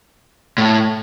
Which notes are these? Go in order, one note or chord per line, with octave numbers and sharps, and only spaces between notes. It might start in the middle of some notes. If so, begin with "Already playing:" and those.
A2